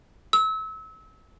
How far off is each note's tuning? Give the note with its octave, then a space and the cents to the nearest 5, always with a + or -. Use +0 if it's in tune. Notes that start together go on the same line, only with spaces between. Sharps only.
E6 -30